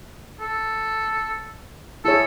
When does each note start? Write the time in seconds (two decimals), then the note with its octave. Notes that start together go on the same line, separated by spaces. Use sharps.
0.40 A4
2.05 E4 G#4 A4 C#5